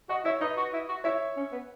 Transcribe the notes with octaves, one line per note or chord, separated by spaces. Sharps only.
F#4 D#5 F#5
E4 C#5 E5
D#4 B4 D#5
F#4
E4
F#4
E4 C#5 E5
C#4
B3